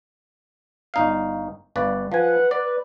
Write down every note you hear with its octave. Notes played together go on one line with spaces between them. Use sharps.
G1 D#4 F5
G1 B4 D5
F3 B4 F#5 G#5
B4 D5